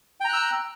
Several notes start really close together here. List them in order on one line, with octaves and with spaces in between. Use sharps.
G5 A#5 F#6 E6